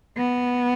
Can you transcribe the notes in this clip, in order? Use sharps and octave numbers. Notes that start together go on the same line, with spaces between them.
B3